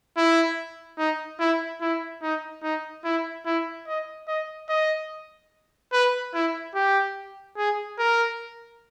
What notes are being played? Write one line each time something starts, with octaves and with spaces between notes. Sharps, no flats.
E4
D#4
E4
E4
D#4
D#4
E4
E4
D#5
D#5
D#5
B4
E4
G4
G#4
A#4